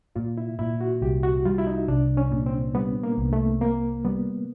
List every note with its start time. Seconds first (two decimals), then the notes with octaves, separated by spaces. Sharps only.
0.16 A#2 F4
0.38 E4
0.59 A#2 E4
0.81 F#4
1.02 C2 G4
1.23 F#4
1.45 G3 F4
1.58 E4
1.67 D#4
1.88 C2 D4
2.17 C#4
2.31 A#2
2.46 C4
2.75 G3 B3
3.03 A#3
3.18 C2
3.33 A3
3.61 A#3 C4
4.05 G3 B3